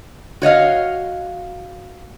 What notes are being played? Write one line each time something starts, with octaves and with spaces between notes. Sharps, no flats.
F#4 C#5 D#5 F5